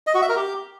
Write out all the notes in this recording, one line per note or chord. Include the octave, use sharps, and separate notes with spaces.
D#5
F#4
E5
A#4
G4